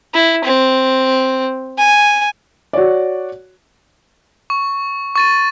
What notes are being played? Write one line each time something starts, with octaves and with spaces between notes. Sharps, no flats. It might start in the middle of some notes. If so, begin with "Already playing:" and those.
E4
C4
G#5
F#4 C#5 D5
C#6
C#6 A6 D#7